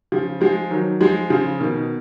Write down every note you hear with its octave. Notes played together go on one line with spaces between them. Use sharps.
C#3 F3
F3 G#3
D#3 F#3
F3 G#3
C#3 F3
B2 D#3